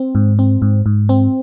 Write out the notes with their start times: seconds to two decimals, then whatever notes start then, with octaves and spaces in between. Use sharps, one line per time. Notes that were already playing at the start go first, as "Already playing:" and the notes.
Already playing: C4
0.15 G#2
0.39 C4
0.62 G#2
0.86 G#2
1.09 C4